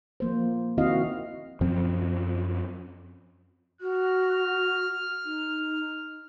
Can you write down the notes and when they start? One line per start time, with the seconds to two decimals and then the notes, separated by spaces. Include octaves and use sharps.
0.20 F3 A#3 C5
0.78 D#3 C4 E4 F#4 D#5 F5
1.61 F#2 F3 C4
3.81 F#4 F6
5.25 D#4